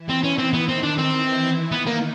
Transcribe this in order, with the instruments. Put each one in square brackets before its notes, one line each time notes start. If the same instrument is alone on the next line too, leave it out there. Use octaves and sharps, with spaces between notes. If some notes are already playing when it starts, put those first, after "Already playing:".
Already playing: [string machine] E3 E4
[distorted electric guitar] C4
C#4
C4
[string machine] D#3 D#4 [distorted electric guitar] B3
[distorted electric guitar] C4
D4
C4
[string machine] E3 E4
[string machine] D#3 D#4 [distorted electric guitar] B3
[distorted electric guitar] A#3